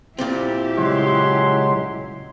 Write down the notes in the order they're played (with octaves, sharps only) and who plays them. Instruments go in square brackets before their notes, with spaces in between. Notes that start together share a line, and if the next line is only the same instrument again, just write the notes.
[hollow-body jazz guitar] A#2 G3 C4 [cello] E4 G4
[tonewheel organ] C#3 F#3 G#3 [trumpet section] D#5 C6